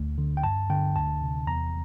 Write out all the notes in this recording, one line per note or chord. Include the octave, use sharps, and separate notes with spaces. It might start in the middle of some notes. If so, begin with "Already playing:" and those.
Already playing: D2
D3
G5
G2 A5
D3 G5
D2 A5
C3
E2 A#5